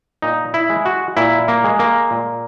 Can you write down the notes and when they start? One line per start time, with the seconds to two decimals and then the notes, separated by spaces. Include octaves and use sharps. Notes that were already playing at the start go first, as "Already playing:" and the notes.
0.22 A#2 D#4
0.54 E4
0.70 G#3
0.85 F#4
1.17 A#2 E4
1.48 A#3
1.64 G#3
1.79 A#3
2.11 A#2